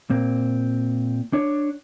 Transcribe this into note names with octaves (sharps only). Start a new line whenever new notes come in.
A#2 C4
D4 C#5